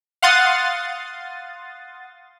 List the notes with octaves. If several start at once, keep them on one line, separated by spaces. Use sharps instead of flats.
F5 F#5 C6 D#6 A6